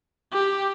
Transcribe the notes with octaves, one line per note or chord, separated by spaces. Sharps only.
G4